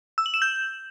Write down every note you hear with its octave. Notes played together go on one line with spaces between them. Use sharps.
E6
F#7
E7
G6